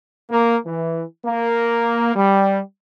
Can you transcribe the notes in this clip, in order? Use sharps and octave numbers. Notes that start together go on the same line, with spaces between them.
A#3
E3
A#3
G3